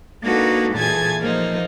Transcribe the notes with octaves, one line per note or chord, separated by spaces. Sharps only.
A#3 D4 D#4 F#4 A4 B4
A#2 E3 G#4 G#5 A5 G#6
E3 F3 A#3 D#4 C5